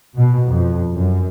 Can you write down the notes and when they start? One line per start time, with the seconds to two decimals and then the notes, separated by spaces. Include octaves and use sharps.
0.17 B2
0.48 F2
0.94 F#2